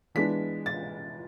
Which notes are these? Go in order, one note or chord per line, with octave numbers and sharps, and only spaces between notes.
E3 G#3 B3 D4 B6
A6